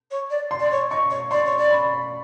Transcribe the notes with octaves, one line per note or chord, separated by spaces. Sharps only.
C#5
D5
C6
D5
C#5
D#5 C#6
C#5
D5 C6
C#5
D5
B5